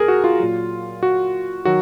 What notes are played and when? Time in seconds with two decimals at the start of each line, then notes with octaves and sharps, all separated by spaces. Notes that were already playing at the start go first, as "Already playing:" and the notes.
Already playing: A#2 G#4 A#4
0.08 F#4
0.24 F4
0.39 A#2 F#3
1.03 F#4
1.65 D#3 F#3 F#4